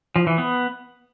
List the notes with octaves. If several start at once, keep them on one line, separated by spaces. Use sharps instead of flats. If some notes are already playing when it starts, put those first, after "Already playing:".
F3
E3
B3